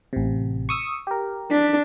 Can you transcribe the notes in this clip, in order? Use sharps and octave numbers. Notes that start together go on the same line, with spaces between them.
A1 C3
C#6 D#6 E6
G4 A#4
D4 B6